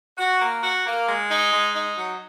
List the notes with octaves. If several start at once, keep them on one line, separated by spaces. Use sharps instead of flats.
F#4
A#3
F#4
A#3
G#3
D#4
G#3
D#4
F#3